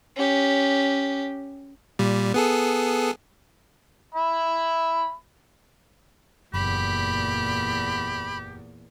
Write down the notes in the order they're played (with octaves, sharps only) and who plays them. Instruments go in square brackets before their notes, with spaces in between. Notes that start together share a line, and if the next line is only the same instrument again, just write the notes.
[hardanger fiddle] C#4 G4
[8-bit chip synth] A#2 G3
B3 G#4 A4
[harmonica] E5 B5
[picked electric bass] F#1 [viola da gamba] E2 A#2 [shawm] G4 [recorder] B5